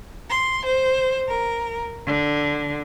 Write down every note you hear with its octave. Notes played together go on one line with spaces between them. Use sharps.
C6
C5
A#4
D3